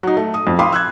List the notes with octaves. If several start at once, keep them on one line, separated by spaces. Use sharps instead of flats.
F#3 D#4
A3
D#6
F2
F5 G5 B5 C6 D6 D#6
E6 F#6 G#6